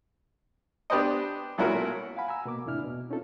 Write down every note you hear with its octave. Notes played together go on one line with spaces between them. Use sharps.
B3 D4 G4 B4 C5 D#5
B1 A#2 C#4 E4 F#4 A#4
F5 F#5 G#5 B5
G#5 A#5 E6
B2 A#3 D6
E2 A2 C3 D4 E4 F6
B2
C4 C#4 D#4 F4 A4